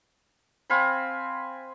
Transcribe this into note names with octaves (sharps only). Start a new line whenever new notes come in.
C4 F5 G#5 B5